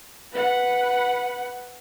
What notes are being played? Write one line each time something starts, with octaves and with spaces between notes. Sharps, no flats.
B4 F#5